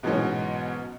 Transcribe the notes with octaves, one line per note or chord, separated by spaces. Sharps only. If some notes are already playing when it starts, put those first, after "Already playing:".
G#2 B2 E3 F#3 B3 C#4